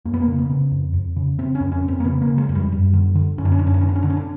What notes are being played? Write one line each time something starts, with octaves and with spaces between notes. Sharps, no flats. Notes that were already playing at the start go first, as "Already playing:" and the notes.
F2 A#3
B3
A#3
C#3
B3
C#3
F2
F2
C#3
C#3 C4
C#4
F2
C#4
F2
C4
A#3
C#3 B3
A#3
C#3
G#3
F2
G3
F#2
D3
D3
F#2 C#4
D4
C#4
F#2 D4
C#4
D4
D3 C#4
D4
C#4
D3 D4
C#4
D4